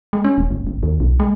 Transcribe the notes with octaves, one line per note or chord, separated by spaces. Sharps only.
G#3
C#4
D#1
G1
G1
D#2
B1
G#3